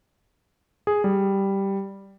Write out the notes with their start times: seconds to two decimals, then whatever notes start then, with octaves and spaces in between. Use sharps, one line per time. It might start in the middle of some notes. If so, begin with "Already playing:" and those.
0.87 G#4
1.04 G3